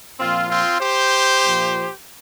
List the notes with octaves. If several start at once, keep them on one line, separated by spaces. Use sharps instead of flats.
A#2 F3 C4 F4
C4 F4
G4 C5
A#2 F3